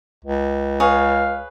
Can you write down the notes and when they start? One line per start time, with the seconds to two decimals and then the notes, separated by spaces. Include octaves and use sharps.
0.25 C#2
0.80 G#4 B4 C#5 F5